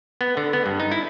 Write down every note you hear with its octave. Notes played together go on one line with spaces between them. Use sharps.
B3
D3
B3
G2
D#4
E4